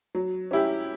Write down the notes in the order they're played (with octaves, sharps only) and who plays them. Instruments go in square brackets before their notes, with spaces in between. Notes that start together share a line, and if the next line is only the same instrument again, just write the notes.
[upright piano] F#3
C#4 E4 G4